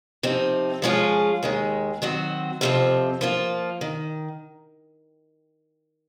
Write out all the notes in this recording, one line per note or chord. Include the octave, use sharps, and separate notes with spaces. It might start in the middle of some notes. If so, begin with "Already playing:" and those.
C3 F3 C4 D#4
F3 G#3 C#4 F4 G#4
D#2 D#3 G#3
D#3 F#3 C4 F#4
F2 C3 F3 C4
F3 A#3 F4
D#3